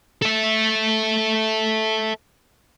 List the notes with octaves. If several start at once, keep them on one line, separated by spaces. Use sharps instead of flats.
A4 E5